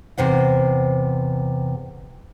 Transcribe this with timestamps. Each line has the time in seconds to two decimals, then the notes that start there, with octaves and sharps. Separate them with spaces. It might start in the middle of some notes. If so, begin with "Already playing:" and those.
0.18 E2 C3 C5 F#5